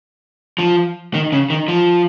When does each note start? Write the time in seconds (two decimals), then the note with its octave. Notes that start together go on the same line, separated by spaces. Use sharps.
0.58 F3
1.14 D#3
1.32 C#3
1.50 D#3
1.68 F3